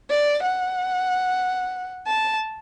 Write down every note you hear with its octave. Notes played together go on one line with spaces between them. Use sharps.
D5
F#5
A5